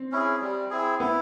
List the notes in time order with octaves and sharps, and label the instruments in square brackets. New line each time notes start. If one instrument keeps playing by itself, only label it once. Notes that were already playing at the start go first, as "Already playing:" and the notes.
Already playing: [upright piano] C4
[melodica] C#4 E4 G#4
G3
C4 E4 G#4
[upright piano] B3 [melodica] E4